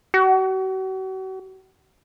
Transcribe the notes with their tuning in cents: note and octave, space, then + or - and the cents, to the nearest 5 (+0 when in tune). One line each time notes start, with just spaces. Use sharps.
F#4 +40